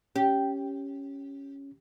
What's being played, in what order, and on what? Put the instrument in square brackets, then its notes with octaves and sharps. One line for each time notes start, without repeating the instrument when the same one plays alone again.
[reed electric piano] C#4 [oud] G4